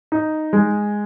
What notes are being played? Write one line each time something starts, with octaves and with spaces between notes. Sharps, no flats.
D#4
G#3